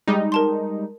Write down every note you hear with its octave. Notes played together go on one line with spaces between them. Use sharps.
G3 G#3 D#4
A#4 A5 C6